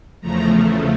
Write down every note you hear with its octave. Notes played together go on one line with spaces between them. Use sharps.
E2 C#3 F3 A3 A#5